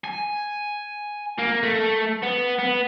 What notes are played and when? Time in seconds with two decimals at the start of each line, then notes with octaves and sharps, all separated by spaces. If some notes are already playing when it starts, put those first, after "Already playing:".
0.04 G#5
1.39 A#3
1.63 A3
2.23 B3
2.59 B3